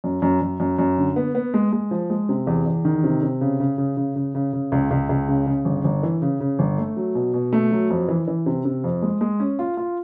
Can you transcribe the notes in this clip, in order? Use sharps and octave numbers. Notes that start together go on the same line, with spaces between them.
F#2
F#2
F#2
F#2
F#2
D3
B3
B3
G#3
G#3
F3
G#3
C3
E2
E2
D#3
C3
C3
C#3
C#3
C#3
C#3
C#3
C#3
C#3
C#2
C#2
C#2
C#3
C#3
G1
G1
E3
C#3
C#3
G1
A3
F#3
B2
B2
A3
F#3
F2
E3
E3
C3
C3
F2
G#3
G#3
C#4
F4
F4